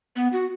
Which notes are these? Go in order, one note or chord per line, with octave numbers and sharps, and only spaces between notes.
B3
F#4